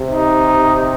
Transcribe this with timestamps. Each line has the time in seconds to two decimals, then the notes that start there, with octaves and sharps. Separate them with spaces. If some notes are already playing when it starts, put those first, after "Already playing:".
Already playing: C3
0.11 D#4